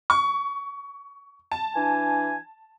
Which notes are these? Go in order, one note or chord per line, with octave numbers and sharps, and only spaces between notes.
C#6
A5
E3 D4 G#5